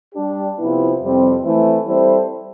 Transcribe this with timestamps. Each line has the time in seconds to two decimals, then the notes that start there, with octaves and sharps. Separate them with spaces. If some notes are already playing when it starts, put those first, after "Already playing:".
0.15 G3 D4 G4
0.58 C3 F3 B3 E4
1.01 F2 C3 G3 C4
1.42 E3 A3 C4 E4
1.85 G3 C4 E4 A4 C5